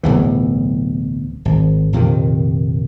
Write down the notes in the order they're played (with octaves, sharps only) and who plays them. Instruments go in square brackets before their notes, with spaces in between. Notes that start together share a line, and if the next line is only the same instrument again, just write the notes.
[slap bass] D1 B1 E3
G#1
A#1 F2 C3 D#3